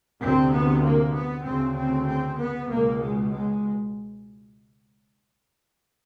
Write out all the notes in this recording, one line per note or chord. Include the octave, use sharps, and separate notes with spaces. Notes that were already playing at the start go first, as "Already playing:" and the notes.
D2 C3 C4
B3
A#3
B3
D2 C#3 C4
C4
C4
B3
C#2 B2 A#3
G#3
G#3